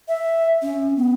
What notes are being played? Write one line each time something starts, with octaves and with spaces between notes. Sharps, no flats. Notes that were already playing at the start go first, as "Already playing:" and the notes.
E5
C#4
B3